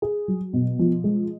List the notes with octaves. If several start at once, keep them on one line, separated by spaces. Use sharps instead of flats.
G#4
F#3
B2
F3
G#3